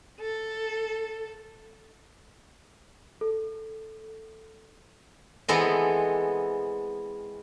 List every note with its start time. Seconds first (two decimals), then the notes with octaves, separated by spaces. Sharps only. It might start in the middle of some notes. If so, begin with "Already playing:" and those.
0.20 A4
3.21 A4
5.48 E3 G#3 B3 C4 A4 D#5